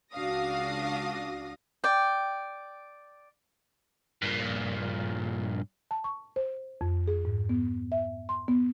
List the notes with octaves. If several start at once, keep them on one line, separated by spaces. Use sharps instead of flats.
C#2 D4 F#4 F5 D#6 A#6
D5 G5
G2 A#2
A5
C#6
C5
F2
G#4
G#2
B3
E5
C6
B3